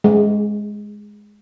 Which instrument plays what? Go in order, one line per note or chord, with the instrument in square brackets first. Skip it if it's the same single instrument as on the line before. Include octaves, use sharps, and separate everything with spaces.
[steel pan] G#3